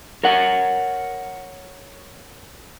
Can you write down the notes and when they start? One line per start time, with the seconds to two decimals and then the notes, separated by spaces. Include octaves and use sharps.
0.24 A#4 C#5 F#5